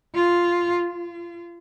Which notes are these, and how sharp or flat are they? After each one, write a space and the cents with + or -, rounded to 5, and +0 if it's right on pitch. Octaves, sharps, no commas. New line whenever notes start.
F4 +0
F4 -30